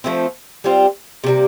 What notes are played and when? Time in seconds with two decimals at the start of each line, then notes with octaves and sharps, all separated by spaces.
0.04 F3 A3 C4
0.64 G3 C4 F4
1.24 C3 G3 A#3